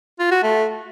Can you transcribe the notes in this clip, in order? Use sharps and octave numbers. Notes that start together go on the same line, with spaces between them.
F4
F#4
A3